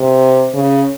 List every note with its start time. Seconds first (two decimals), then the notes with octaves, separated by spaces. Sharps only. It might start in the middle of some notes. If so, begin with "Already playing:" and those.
Already playing: C3
0.54 C#3